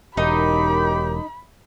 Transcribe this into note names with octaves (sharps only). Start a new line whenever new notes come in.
E1 F#2 D#3 D#4 G4 B5